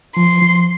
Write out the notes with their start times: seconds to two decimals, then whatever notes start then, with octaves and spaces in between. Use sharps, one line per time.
0.16 F3 C6
0.42 F3